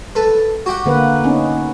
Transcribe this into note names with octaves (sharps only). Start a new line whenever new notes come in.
A4 B4
F#4 G4 F#5
D3 A#3 B4
B3 C#4 D#4